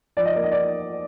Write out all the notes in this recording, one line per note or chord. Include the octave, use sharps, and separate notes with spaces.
F3 D5
D#5
A#3 D5
D#5
D5